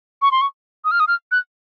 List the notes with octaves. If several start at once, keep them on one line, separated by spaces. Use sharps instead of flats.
C#6
C6
C#6
D#6
F6
D#6
F6
F#6